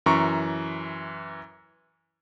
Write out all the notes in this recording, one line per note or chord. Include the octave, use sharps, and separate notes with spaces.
F#2 E3 A#5 C#6